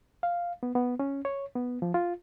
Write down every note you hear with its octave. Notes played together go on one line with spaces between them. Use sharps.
F5
B3
B3
C#4
C#5
B3
F3
F4